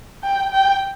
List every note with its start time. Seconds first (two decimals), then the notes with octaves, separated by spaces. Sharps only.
0.23 G5
0.51 G5